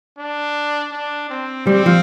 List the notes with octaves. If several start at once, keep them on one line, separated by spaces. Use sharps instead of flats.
D4
D4
C4
G3 C4
F3